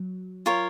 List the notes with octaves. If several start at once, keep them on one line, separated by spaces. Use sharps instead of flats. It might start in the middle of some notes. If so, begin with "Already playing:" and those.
Already playing: F#3
F4 A#4 C#5